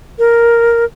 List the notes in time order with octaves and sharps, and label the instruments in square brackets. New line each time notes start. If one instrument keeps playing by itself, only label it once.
[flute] A#4